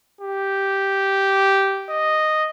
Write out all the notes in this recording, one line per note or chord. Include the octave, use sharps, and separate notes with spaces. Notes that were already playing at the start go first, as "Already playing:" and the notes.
G4
D#5